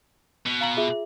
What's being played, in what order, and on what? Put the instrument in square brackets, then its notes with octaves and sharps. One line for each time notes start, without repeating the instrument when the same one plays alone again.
[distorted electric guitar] B2
[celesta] F5 A#5 F#7
F4 G#4 E5